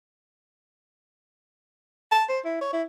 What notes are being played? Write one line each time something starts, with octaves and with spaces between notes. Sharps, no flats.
A5
C5
E4
C#5
E4